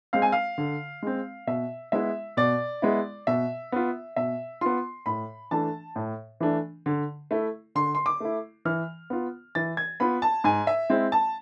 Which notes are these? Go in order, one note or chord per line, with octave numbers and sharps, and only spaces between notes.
G#3 C4 F5
G#5
F5
D3
G#3 C4
B2 E5
G#3 B3 E4 E5
B2 D5
G#3 B3 E4
B2 E5
B3 F4
B2 E5
B3 F4 C6
A2 B5
E3 A3 D4 A5
A2
E3 A3 D4
D3
A3 E4
D3 C6
C6
D6
A3 E4
E3 F6
B3 F4
E3 A6
G#6
B3 F4 B5
A5
G#2 G#5
E5
G#3 C4 E4
A5